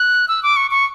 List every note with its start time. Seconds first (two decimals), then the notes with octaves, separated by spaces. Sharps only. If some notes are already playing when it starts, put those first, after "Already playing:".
Already playing: F#6
0.28 E6
0.43 D6
0.56 C#6
0.71 C#6